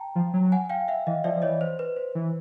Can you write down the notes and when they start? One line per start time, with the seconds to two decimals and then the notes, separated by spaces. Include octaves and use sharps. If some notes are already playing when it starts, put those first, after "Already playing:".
Already playing: G5 A5 A#5
0.15 F3
0.33 F#3
0.52 F#5 G#5
0.70 F5 G5
0.88 E5 F#5
1.07 E3 D#5 F5
1.24 F3 D5 E5
1.36 F3
1.42 E3 C#5 D#5
1.61 C5
1.79 B4
1.96 C5
2.15 E3